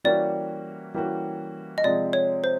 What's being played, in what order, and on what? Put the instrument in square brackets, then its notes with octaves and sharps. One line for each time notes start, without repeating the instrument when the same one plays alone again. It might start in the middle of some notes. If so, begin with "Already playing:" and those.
[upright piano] E3 G3 A#3 C#4 F#4 [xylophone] D5
[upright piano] E3 G3 A#3 C#4 F#4
[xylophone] D#5
[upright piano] C3 F3 G#3 C4 [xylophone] D5
[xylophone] C#5
C5